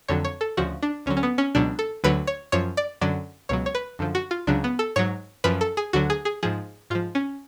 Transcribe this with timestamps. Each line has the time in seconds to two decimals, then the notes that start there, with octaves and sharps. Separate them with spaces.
0.08 F2 D3 F#3 C#5
0.25 C#5
0.41 A4
0.57 D2 C#3 F3 F#4
0.83 D4
1.06 D2 D3 F#3 C#4
1.17 C#4
1.23 B3
1.38 C#4
1.55 C#2 B2 F#3 D4
1.79 A4
2.04 D2 D3 F#3 B4
2.27 C#5
2.52 F#2 F3 C#5
2.77 D5
3.01 F#2 D3 F#3 D5
3.49 C#2 B2 F#3 C#5
3.66 C#5
3.75 B4
3.99 F#2 D3 F3
4.15 F#4
4.31 F4
4.47 C#2 C#3 F#3 D4
4.64 B3
4.79 A4
4.96 G#2 F#3 C#5
5.44 F#2 F3 B4
5.61 A4
5.77 G#4
5.93 D2 D3 F#3 F#4
6.10 G#4
6.25 G#4
6.43 G#2 F3 G#4
6.90 G#2 F3 F4
7.15 C#4